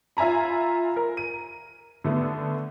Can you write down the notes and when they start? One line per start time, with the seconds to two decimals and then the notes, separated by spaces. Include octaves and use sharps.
0.17 F4 E5 G#5 A#5 B5
0.96 A#4
1.17 D#7
2.04 D3 A3 B3